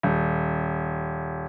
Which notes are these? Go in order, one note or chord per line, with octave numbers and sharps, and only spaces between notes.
D#1